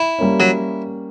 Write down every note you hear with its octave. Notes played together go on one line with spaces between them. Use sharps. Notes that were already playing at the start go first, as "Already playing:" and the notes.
Already playing: E4
G3 A#3 C#4
F#3